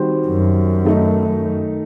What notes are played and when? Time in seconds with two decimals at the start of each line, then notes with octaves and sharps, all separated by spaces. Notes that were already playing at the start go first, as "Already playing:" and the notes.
Already playing: D#3 G3 C4 F#4 C5
0.27 F#2
0.84 D#3 A3 D#4